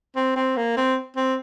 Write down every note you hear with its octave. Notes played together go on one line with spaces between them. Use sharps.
C4
C4
A#3
C4
C4